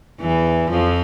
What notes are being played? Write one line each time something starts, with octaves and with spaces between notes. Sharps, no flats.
E2 E3
F2 F3